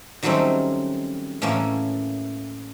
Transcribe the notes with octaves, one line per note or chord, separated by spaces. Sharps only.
D#3 F#3 G3 A3 C4 C#4
A2 E3 A3 A#3 C#4